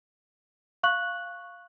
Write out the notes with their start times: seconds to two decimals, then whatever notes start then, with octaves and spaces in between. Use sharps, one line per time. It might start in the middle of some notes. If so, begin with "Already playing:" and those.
0.83 F5 C#6 F#6 F#7